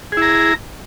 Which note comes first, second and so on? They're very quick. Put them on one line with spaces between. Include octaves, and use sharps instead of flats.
G#4 E4 A#5